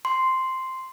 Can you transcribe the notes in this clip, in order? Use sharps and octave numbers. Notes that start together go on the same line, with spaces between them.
C6